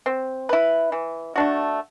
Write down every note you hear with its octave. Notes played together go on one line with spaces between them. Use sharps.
C4
E4 B4
E3
A3 D4 F#4